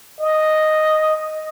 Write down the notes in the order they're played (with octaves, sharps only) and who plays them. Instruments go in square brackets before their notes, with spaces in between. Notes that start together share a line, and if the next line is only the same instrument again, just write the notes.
[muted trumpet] D#5